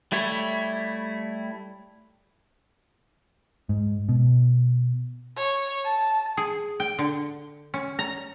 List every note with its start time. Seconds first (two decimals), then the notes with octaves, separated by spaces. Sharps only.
0.12 G3 A3 E4 C#5
3.69 G#2
4.09 B2
5.37 C#5
5.85 A5
6.37 G#4
6.80 G5
6.99 D3
7.74 C#4
7.99 A#5